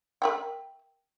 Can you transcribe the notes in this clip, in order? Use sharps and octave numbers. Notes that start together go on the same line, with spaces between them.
A#4 E5 G5